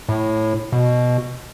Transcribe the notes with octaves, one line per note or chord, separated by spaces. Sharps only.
A2
B2